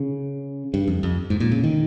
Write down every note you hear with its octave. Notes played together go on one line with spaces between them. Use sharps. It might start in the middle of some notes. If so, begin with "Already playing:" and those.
Already playing: C#3
G2
F2
F2
G#2
A#2
C#3
D#3